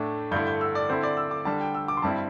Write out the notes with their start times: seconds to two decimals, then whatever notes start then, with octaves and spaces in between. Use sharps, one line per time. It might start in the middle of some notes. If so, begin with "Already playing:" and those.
Already playing: A2 A3 D4
0.31 G2 D3 A3 E4 G6
0.47 G6
0.61 E6
0.75 D5
0.90 D3 C4 E4 C5
1.03 D5
1.17 E6
1.31 D6
1.45 D3 G3 D4 A5
1.61 G5
1.75 E6
1.88 D6
1.97 C6
2.02 G2 G3 C4 E4 A5